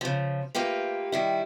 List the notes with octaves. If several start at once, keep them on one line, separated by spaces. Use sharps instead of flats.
C#3 F3
A3 A#3 F4 G4 B4
D#3 G3 E4